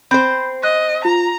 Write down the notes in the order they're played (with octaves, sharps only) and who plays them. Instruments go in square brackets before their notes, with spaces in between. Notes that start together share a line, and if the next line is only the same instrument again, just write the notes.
[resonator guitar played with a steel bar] C4 C5 [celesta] B5 G6
[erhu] D#5 [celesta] F#6
[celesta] F4 [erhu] A#5